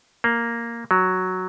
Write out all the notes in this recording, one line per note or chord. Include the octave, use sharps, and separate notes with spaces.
A#3
F#3